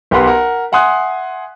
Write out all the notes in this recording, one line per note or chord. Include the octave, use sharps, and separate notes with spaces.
B1 G4 A#4 B4 F#5 C6
A#4 F#5
E5 F#5 G#5 C6 D#6 F#6